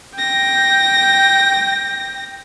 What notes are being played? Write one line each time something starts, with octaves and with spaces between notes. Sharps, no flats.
G5 A#6